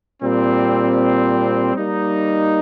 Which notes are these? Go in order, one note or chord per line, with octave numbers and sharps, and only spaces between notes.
A#2 G3 C4
G3 A#3 D#4